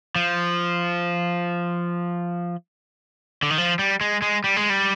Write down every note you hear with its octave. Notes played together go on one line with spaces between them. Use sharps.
F3
D3
D#3
F3
G3
G#3
G#3
G3
G#3
G3